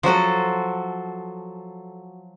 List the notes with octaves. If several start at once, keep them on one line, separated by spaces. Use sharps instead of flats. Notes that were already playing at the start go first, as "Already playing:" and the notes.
F3 F#3 F#4 A4